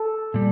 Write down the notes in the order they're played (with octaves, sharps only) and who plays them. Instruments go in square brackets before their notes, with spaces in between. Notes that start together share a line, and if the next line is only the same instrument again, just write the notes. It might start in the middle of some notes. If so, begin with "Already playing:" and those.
Already playing: [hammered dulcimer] A4
[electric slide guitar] A#2 G3